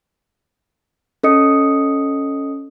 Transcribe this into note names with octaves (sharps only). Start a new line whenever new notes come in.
C#4 A4 D#5 D#6 C#7